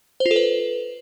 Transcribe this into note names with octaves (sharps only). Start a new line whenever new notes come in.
C5
F4
A4
B4